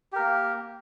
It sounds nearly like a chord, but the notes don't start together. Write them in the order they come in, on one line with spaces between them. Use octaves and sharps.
G4 A#4 A#3